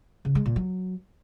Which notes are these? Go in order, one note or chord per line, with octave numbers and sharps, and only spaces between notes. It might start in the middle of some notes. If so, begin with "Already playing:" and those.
C#3
G#3
A#2
F#3